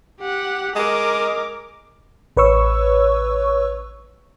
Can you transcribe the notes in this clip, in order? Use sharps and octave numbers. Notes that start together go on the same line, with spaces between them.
G4 F#5
G#3 A#4 D6
A1 B4 C#5 C#6 E6